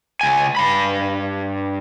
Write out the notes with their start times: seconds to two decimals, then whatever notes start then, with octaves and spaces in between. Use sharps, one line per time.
0.21 C#2 G#5
0.57 G2 B5